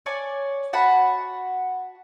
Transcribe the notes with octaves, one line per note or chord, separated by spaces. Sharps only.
C#5 D5 G#5 D6
F#4 F#5 A5 B5